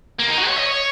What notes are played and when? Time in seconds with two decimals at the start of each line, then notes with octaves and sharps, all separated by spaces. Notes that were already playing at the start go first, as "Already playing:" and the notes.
0.19 A#3
0.28 D#4
0.38 F#4
0.48 C#5
0.57 D#5
0.67 C#5